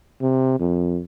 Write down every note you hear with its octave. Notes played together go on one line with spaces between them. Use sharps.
C3
F2